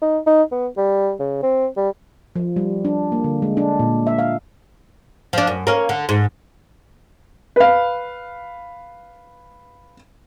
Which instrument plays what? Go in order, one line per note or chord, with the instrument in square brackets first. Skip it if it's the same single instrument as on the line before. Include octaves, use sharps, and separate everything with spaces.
[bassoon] D#4
D#4
B3
G3
C#3
C4
G3
[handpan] F3
G3
D4
A#3
D3
G#3
D4
A#2
E5
F5
[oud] F3 D4
F#2
A#3 C#4
D3
G#2
[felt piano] B4 F5